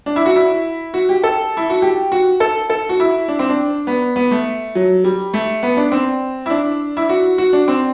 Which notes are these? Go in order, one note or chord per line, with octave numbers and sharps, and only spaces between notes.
D4
E4
F#4
E4
F#4
G4
A4
E4
F#4
G4
F#4
A4
A4
F#4
E4
D4
C4
D4
B3
B3
A3
F#3
G3
A3
B3
D4
C4
E4
D4
E4
F#4
F#4
D4
C4